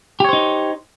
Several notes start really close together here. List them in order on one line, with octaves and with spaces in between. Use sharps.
G4 C#5 C5 D#4